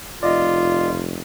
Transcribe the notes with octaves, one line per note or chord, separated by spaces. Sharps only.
F1 F4 D5 D#5